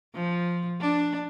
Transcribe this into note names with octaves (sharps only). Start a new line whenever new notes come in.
F3
D4